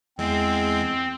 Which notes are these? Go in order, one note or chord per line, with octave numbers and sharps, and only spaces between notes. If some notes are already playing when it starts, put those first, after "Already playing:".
E2 G#3 C4